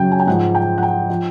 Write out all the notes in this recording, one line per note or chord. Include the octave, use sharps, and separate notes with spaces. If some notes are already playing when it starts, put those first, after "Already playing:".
Already playing: F#2 C#3 F#3 G5
G#5
G5
G#2 F3 F#5
G5
F#5
G5
F3